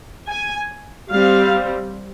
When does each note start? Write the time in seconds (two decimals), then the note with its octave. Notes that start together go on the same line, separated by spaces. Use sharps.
0.28 G#5
1.10 G3 C4 F5